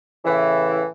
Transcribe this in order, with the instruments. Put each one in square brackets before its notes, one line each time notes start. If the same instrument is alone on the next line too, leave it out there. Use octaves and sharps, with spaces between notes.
[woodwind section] A2 C#3 E3